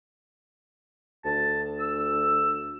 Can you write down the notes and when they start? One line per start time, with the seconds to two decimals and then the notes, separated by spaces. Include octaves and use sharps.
1.25 D2 A5
1.80 E6